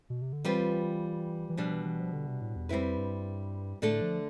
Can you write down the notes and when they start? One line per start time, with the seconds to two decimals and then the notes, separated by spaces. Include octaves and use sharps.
0.10 B2
0.22 C3
0.33 D3
0.45 E3 G3 C4 F4 B4
1.49 E3
1.57 B2 F3 G3 D4
1.72 E3
1.85 E3
2.00 F3
2.13 D3
2.27 C3
2.42 A2
2.56 E2
2.69 F2 G3 C4 E4 B4
2.98 G2
3.82 A2 D3 A3 D4 A4
4.02 F3